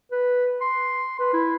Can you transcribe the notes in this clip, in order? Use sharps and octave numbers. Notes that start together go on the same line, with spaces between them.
B4
C6
B4
E4